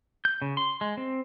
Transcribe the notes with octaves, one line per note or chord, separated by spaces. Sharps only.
G6
C#3
C6
G#3
C4